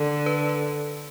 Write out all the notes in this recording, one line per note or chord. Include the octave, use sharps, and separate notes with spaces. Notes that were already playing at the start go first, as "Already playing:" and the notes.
Already playing: D3 A4
B4